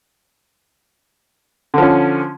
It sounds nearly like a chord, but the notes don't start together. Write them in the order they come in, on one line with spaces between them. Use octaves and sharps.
D3 F3 C#4